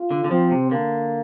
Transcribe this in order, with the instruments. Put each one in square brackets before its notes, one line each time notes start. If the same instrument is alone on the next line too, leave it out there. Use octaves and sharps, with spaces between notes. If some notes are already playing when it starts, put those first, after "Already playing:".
Already playing: [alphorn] F4
[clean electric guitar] D3
D3
[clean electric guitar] F3 [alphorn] C4
[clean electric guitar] C3
[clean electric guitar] D3 [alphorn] A#3